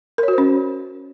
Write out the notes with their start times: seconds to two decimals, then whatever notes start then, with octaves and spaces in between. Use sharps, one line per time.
0.18 A#4
0.23 C#5
0.28 F#4
0.33 C5
0.38 C#4